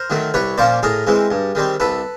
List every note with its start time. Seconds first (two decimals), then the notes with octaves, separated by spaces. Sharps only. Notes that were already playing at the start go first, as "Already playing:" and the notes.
Already playing: A#4 C5
0.10 D#3 F#3 A3
0.34 C2 B4 C#5
0.58 A#2 F3 A#3 C#4 C5 D5
0.83 A2 G#4 A#4
1.07 E3 G#3 C4
1.31 G2
1.55 D#3 G3 C4
1.80 C2 A4 B4